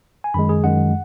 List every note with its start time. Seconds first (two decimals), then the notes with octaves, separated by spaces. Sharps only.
0.24 G#5
0.34 F#2 D#3 G#3 B5
0.49 G#4
0.64 F#2 D#3 G#3 F#5